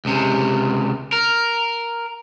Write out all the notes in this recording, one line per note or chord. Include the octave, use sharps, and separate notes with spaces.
C#2 C3
A#4